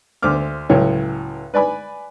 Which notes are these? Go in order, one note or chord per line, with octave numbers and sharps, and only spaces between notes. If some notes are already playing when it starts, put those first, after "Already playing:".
D2 C5 D6 F6
C#2 A2 F#3 C#5 G5
B4 D5 G#5 B5